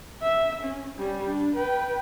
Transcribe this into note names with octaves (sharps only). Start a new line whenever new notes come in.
E5
C#4
G3 C#4
D4
B4 G5